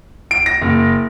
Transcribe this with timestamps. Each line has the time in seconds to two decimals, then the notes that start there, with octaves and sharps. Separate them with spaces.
0.31 D7
0.46 A#6
0.62 F#1